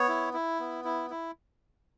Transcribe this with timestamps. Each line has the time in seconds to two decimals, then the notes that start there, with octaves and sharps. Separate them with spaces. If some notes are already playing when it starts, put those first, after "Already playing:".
Already playing: B3 C#5
0.08 E4
0.34 E4
0.60 B3
0.85 E4
1.10 E4